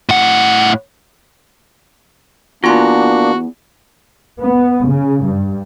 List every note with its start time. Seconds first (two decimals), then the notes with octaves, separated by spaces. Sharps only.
0.09 A2 F#5
2.64 E2 A#3 D4 F4 F#4 C6
4.40 B3
4.88 C#3
5.25 G2